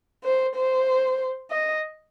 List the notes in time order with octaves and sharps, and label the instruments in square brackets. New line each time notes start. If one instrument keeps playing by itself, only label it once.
[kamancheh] C5
C5
D#5